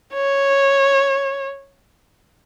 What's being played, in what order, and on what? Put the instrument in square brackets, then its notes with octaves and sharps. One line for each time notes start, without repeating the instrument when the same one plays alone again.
[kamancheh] C#5